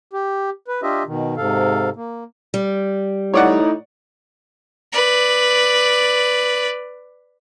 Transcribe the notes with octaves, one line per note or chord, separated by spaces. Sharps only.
G4
B4
D4 F4 G4 D#5 E5
B2 D#3
G#2 C3 A4 F5
A#3
G3
A2 D#4 C#5 D5 F#5
B4 D5